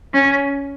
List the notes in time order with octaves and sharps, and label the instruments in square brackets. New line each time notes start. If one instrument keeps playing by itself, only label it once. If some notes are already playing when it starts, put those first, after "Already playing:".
[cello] C#4